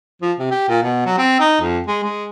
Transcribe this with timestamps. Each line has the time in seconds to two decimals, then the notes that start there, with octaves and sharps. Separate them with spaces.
0.22 F3
0.39 C3
0.51 G4
0.69 A#2
0.83 B2
1.06 F#3
1.18 C4
1.40 D#4
1.62 F2
1.87 G#3
2.04 G#3